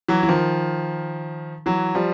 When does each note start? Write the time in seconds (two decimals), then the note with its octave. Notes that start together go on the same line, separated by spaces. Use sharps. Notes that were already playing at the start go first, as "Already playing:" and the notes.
0.09 E3 F#3
0.23 E3
0.29 D#3 F3
1.66 E3 F#3
1.95 F3 G3